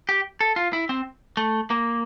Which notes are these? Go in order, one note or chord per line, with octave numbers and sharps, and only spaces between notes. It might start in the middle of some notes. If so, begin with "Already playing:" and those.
G4
A4
F4
E4
C4
A3
A#3